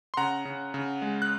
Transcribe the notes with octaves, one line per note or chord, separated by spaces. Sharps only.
C6
C#3 F#5 A#5
C#3
C#3
G#3
F#6